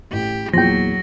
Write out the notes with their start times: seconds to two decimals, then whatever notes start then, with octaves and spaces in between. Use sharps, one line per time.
0.13 A1 G4
0.54 E2 A#2 F3 F#3 G5 A#6